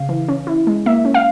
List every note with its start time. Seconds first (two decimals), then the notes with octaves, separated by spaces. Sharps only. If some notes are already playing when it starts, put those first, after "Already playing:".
Already playing: C#3 F5
0.09 E3
0.28 C#4
0.47 E4
0.67 G#3
0.86 A#3 E5
1.05 C#4
1.14 F5